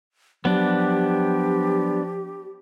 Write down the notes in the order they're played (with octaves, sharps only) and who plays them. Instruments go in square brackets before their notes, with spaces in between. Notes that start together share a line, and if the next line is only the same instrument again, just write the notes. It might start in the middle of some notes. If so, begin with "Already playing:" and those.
[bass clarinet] F3 [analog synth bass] F#3 [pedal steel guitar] B3 D4 [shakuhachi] G4